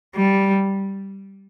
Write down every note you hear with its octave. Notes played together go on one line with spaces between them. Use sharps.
G3